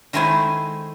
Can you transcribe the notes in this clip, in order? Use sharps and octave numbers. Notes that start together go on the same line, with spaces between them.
D#3 G#3 A3 E4 C5 G#5